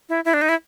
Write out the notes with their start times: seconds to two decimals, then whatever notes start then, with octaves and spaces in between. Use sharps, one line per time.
0.09 E4
0.25 E4
0.34 D4
0.42 D#4
0.49 E4